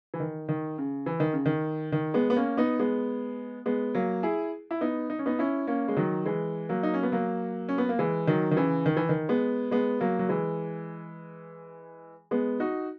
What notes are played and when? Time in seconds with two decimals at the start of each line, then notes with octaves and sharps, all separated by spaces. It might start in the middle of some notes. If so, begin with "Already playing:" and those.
0.14 E3
0.20 D#3
0.49 D#3
0.78 C#3
1.06 E3
1.20 D#3
1.33 C#3
1.46 D#3
1.92 D#3
2.14 G#3 B3
2.30 B3
2.36 A#3 C#4
2.57 B3 D#4
2.79 G#3 B3
3.66 G#3 B3
3.94 F#3 A#3
4.23 E4 G#4
4.71 E4
4.81 B3 D#4
5.10 D#4
5.19 C#4
5.26 B3 D#4
5.39 C#4 E4
5.67 A#3 C#4
5.88 G#3
5.96 D#3 F#3
6.26 E3 G#3
6.69 F#3 A#3
6.83 D#4
6.94 C#4
7.03 B3
7.12 F#3 A#3
7.69 C#4
7.78 B3
7.89 A#3
7.99 E3 G#3
8.27 D#3 F#3
8.51 D#3
8.57 C#3 E3
8.86 D#3
8.97 E3
9.09 D#3
9.29 G#3 B3
9.71 G#3 B3
10.00 F#3 A#3
10.19 F#3
10.29 E3 G#3
12.31 G#3 B3
12.60 D#4 F#4